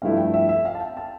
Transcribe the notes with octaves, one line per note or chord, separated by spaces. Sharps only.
G2 F3 A3 E4 F5
G5
E5
E5
F5
A5
G5
A5